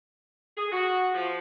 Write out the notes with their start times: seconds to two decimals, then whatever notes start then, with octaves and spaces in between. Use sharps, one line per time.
0.57 G#4
0.71 F#4
1.14 F3